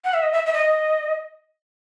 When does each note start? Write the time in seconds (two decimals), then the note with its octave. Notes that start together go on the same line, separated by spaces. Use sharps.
0.05 F#5
0.14 E5
0.23 D#5
0.33 E5
0.46 E5
0.53 D#5